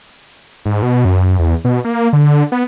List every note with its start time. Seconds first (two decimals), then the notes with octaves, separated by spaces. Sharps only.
0.66 G#2
0.82 B2
1.05 F#2
1.39 E2
1.65 B2
1.85 A#3
2.13 D3
2.52 B3